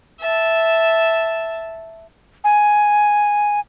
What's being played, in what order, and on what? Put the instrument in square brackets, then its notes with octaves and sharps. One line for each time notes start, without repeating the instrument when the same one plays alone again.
[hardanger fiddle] E5 A5
[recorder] G#5